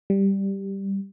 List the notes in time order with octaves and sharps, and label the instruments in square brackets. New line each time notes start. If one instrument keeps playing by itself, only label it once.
[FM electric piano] G3